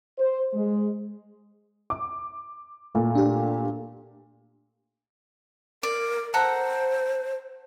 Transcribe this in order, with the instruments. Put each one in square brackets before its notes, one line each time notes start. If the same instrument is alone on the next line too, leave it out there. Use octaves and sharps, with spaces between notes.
[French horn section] C5
G#3
[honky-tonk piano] D6
A#2 A3
[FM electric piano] D4 G4
[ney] A#4 [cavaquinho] D5
[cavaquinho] A4 F#5 A#5 [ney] C5